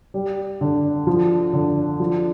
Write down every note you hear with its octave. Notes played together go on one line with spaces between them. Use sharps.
G3
D3
F3
D3
F3